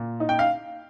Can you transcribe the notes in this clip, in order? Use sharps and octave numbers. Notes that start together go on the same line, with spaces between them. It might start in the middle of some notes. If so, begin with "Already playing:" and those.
Already playing: A#2
D#4
G5
F5